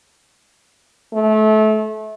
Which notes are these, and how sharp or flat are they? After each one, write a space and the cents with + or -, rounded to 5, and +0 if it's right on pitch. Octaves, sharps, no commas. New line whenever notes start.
A3 -30